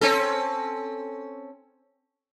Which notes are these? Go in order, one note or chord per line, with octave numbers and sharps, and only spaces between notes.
C4 C#4 A4